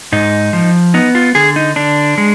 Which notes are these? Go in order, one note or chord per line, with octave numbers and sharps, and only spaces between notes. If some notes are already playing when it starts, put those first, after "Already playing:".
G#2 D#4
F3
B3 D#4
F4
D3 G#4
D#4
D3 D4
G#3